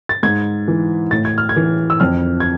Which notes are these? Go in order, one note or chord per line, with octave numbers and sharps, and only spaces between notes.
A6
G#2 G#6
E3
A2 A6
G#6
F6
G#6
E3
E6
F2 F6
G#6